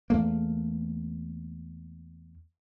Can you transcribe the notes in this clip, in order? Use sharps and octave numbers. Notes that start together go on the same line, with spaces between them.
E2 A3 A#3